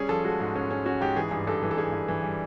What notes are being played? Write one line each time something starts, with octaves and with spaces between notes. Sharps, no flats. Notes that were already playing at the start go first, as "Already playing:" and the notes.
Already playing: G3 C#4 G#4
F3 A4
G#3 F#4
G#2
C#4
C#4
C#4 F#4
G#2 G4
E3 G#4
G2
G2 A4
E3
A4
G2 G#4
G2
E3
G3